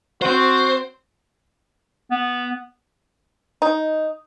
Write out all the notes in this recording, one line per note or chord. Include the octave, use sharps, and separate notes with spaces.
C4 F#4 C5
B3
D#4